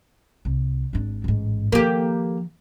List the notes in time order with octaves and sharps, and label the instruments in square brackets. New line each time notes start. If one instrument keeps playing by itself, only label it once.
[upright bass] C2
G#1 D4
A1 G#2
[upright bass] D#3 F3 [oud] A#3 G4